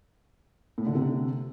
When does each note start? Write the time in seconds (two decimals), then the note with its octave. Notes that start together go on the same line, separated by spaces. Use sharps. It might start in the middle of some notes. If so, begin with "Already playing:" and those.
0.78 A2
0.86 D3
0.95 C3